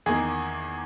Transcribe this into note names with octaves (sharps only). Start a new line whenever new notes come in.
E2 D#3 A#3 G#4